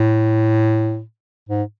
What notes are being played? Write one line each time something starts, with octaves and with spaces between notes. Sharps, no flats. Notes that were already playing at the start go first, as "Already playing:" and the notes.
Already playing: A2
G#2